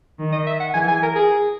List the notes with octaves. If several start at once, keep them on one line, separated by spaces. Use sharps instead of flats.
D#3
D#5
E5
F#5
E3 G#5
G#5
A#4
G#4